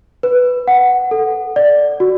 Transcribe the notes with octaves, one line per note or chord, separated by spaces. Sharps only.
B4
F#5
A4
D5
F#4